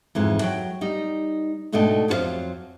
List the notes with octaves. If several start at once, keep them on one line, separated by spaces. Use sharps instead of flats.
F2 G#2 E3
F#3 G5
G3 D#4
G#2 B2 A3 D4 D#5 G5
F2 F#3 F#4 C5 F5